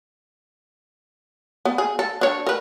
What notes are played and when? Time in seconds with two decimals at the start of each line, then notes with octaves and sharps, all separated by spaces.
1.65 B3
1.78 G#4
1.99 A4
2.21 D4 C#5
2.46 A#4 B4